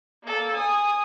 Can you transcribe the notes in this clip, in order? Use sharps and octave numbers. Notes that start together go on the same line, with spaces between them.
A#3 A4
G#5 D#6